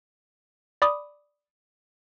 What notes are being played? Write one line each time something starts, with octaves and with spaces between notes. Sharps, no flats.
D5 B5 D6 D#6